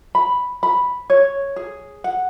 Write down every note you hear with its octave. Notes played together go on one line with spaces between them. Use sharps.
B5
B5
C#5
G#4
F#5